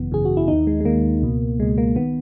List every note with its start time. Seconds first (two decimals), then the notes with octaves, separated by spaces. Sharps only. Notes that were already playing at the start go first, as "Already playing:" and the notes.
Already playing: G#1 F#2 C#3 E3 B3
0.11 G#1 F#2 C#3 E3 G#4
0.25 F#4
0.37 E4
0.48 D#2 D#3 D#4
0.67 G#3
0.80 G#3
0.85 D#2 D#3 A#3
1.22 C#2 B2
1.60 C#2 B2 G#3
1.78 A#3
1.96 D#3 B3